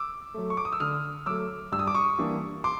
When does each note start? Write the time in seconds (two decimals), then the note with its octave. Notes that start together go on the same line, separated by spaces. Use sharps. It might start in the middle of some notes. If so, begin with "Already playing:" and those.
Already playing: D6 E6
0.34 F#3 A3
0.50 C#6
0.57 D6
0.65 D#6
0.72 E6
0.80 D3 D#6 F6
1.26 F#3 A3 D6 E6
1.72 G2 E6
1.79 D#6
1.87 D6
1.95 C#6 D#6
2.18 E3 G3 A#3 D4
2.64 C6 D6